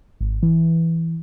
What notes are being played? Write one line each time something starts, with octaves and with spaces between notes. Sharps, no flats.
G#1
E3